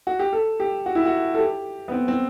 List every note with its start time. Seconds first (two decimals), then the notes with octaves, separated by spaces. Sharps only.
0.07 F#4
0.19 G4
0.33 A4
0.60 G4
0.86 F#4
0.95 E4
1.06 F#4
1.34 A4
1.39 G4
1.88 B3
1.92 C4
2.08 C4